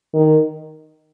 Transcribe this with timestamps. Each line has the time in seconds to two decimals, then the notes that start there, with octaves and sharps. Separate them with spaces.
0.14 D#3